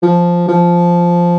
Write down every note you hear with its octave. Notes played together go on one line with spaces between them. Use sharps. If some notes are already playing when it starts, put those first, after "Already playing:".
F3
F3